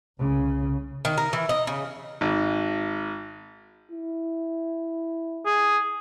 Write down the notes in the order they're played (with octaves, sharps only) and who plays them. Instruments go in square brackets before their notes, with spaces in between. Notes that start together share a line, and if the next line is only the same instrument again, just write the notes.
[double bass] C2 C#3
[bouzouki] D#3
A#4
E3
D#5
C#3
[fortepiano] G#1
[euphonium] E4
[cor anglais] G#4